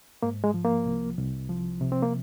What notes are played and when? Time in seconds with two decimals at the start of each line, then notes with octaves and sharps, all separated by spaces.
0.23 G#2 A#3
0.44 G#3
0.54 F3
0.65 A#3
0.86 C2
1.17 C2
1.49 F3
1.81 C3
1.92 C4
2.02 A#3